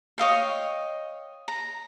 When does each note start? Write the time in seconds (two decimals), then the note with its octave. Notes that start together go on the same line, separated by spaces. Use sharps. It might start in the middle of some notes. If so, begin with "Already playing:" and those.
0.18 C#5 D#5 F5 G5
1.48 A#5